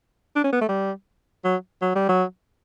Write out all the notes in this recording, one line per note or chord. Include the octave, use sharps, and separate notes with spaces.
D4
C#4
B3
A3
G3
F#3
F#3
G3
F#3